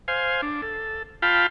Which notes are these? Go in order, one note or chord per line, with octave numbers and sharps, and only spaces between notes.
C5 F5 G#5
D4
A4
F4 F5 G5 A5 B5